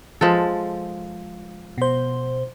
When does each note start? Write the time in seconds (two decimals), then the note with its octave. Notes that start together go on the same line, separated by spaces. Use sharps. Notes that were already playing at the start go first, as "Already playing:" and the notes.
0.21 F3 G#3 A4
1.78 B2 C5